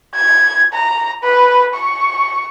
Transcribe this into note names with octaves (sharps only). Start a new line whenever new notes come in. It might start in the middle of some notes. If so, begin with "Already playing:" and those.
G#6
A#5
B4
C#6